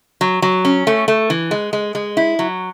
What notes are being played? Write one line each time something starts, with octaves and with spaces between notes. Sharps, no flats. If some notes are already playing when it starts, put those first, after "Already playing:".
F#3
F#3
C#4
A3
A3
E3
G#3
G#3
G#3
E4
F#3